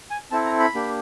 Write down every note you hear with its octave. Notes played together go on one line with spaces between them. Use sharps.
G#5
C4 E4 A4 A5
A#5
B5
A#3 D4 G4